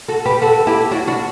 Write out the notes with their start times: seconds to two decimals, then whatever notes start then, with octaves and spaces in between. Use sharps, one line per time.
0.08 F#4 A4
0.26 G4 B4
0.42 F#4 A4
0.67 E4 G4
0.91 D4 F#4
1.07 D4 F#4